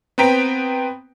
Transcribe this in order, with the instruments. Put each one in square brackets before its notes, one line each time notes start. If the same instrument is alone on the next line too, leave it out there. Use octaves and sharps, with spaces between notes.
[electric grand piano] B3 C4 B4 G5 A#5 B6